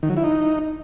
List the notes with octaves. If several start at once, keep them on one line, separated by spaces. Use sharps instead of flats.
D#3
F#3
E4
D#4